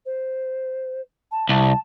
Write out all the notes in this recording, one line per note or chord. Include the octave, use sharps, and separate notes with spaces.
C5
A5
C2 A5